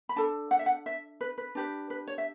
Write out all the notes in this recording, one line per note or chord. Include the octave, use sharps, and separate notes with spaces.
B5
D4 A4 A5
F#5
E5
F#5
E5
B4
B4
D4 G4 B4
B4
C#5
E5